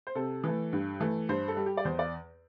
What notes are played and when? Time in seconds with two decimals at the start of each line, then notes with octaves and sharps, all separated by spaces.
0.07 C5
0.15 C3 A4
0.44 E3 A3
0.73 G2
1.00 E3 A3
1.29 G2 C5
1.48 A4
1.57 G3
1.66 G4
1.77 D5
1.85 E2 C5
1.99 D5